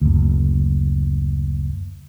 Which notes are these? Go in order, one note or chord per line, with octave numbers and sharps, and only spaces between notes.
F#1 D2